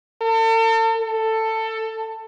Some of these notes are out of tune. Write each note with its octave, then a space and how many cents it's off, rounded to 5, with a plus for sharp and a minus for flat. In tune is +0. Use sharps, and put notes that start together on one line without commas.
A4 +40
A4 +15